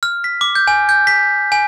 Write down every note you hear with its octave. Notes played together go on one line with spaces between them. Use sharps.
F6
B6
D6
G6
G#5
G6
B6
G#5